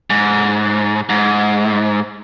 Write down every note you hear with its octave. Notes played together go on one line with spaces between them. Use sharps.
G#2
G#2